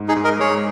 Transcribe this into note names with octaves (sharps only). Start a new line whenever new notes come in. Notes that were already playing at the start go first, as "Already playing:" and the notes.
Already playing: G#2
D#4 G#4
G#2
A#4 D#5
G#3 G#4 C#5